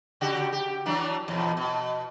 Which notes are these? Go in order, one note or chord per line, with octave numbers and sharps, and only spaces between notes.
C#3 F#4 G4
G4
E3 F#3 D4
E2 B2
B2